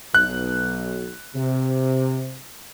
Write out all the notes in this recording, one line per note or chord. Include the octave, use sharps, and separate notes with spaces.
B1 F#6
C3